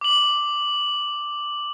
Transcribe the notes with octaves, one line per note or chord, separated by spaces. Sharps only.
D6 F#7